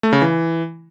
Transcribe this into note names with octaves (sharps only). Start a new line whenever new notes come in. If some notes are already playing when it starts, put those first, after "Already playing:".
A3
C#3
E3